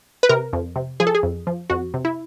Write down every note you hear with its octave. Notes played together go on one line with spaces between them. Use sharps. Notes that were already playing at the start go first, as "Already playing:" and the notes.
B4
C3 A#4
F2
C3
F3 G#4
A4
G#4
F2
F3
F2 F#4
C3
E4